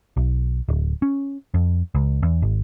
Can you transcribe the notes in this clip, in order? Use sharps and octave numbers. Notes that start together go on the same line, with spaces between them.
B1
D1
C#4
F2
C#2
E2
G#1